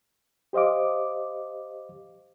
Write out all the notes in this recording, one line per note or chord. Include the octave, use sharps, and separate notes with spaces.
G4 C5 D#5 F5 D6